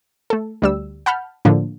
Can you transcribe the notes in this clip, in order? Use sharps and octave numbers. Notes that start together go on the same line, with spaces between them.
A3 A4
D2 G3 E6
F#5 A5 B5 F6 G6
A2 D3 F3 A#3